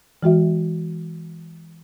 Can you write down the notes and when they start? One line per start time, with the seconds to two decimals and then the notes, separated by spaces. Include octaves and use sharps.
0.23 E3 G#3 F#4 E5